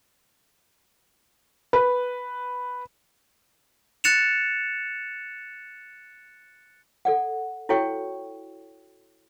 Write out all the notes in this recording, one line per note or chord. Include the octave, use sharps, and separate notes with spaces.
B4
F#6 A6 C#7 E7 F7
A4 D5 F#5
E4 F#4 A4 C#5 G5 C#6